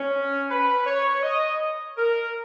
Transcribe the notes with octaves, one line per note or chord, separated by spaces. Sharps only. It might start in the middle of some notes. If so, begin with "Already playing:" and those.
Already playing: C#4
B4
C#5
D#5
A#4